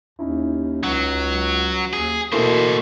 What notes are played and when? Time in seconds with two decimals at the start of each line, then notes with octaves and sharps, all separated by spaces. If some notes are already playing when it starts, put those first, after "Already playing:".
0.19 D#2 C#4 D#4 E4
0.83 C#2 F#3
1.93 D#2 G#4
2.32 B2 A3 A#3 E4 A4 C5